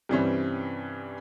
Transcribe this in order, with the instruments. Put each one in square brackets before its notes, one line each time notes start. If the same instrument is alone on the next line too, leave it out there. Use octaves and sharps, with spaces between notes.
[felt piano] G2 C3 E3 G3 C4 C#4